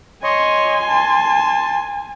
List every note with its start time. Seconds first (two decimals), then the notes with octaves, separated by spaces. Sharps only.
0.23 C#5 D#5 G#5 C6
0.88 A5